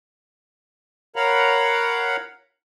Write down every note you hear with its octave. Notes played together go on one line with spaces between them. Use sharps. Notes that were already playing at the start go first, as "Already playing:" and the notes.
A#4 C#5 F5 F#5 A#5 B5